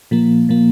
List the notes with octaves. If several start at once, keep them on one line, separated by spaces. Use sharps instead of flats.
A#2 F3 A#3
A#2 F3 A#3